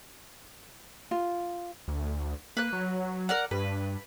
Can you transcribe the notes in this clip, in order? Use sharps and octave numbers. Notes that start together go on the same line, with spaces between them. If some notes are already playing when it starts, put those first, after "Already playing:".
F4
D2
A#3 B4 F#6
F#3
A#4 D5 F#5
G2 B4